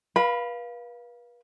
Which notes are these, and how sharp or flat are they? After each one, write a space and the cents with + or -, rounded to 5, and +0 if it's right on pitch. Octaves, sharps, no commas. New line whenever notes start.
B4 -35 F5 +0 B5 +0